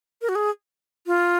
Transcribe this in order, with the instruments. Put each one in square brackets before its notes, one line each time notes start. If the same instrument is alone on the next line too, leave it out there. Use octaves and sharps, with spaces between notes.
[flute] A#4
F#4
G#4
F4